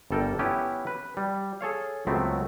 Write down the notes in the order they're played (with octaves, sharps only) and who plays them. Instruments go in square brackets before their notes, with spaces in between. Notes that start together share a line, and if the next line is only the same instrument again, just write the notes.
[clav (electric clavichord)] G1 G3 A4 A#4 G5
B3 C#4 E4 G4 B4
B4
G3
G#4 A4 C#5 F5
C#2 F#3 A3 B3 C4